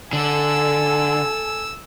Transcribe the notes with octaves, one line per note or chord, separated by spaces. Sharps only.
D3 A4 G#5 E6